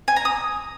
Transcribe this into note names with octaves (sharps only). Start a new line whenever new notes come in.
G#5
A#5
D#6